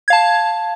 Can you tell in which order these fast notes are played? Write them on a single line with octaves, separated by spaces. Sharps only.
G#6 F5 A5